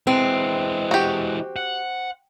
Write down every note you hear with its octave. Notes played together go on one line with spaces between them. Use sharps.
E3 G#3 C4
F#4 G4
F#5